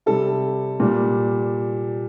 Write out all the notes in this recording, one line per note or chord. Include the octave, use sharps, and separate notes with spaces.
C3 G3 A4
A#2 G3